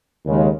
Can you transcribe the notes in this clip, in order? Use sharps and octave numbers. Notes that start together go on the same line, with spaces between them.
D#2 C#3 G#3